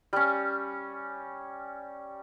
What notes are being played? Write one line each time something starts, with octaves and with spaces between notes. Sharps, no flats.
G3 C#4